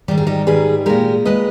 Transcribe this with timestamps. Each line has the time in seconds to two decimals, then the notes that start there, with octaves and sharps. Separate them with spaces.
0.08 G#2 D#3 G3 G4
0.18 G#4
0.27 D#4 G4
0.47 G#2 D#3 G3 G#4 B4
0.86 A#2 G#3 G4 A#4
1.25 A#2 G#3 B4 D#5